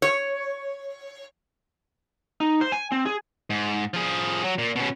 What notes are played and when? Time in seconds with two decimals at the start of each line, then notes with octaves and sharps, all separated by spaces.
0.02 C#5
2.40 D#4
2.61 C5
2.72 G#5
2.92 C4
3.06 G#4
3.50 G#2
3.94 F3 G#4
4.44 F#3
4.58 A#2
4.76 B2 C#4